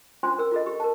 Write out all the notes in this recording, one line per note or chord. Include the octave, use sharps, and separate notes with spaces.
C#4 D4 F4 C5 G#5 C6
A#4 E6
F4 A4 D#5
G4
A#4 A5